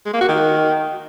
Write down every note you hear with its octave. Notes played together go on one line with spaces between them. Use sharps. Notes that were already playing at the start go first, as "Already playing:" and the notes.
G#3
A#3
F#4
D#3